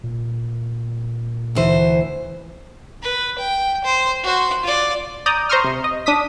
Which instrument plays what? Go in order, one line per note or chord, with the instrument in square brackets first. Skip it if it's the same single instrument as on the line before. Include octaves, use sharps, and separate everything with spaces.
[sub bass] A#2
[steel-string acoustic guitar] D2 E3 C5
[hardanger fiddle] B4
G5
C5
F#4 C5
F4 D5
[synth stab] D5 A#5 D#6 G6
C5 A#5 C6 C#6 D#6 F6
C3
D#5
D4 D6 D#6 B6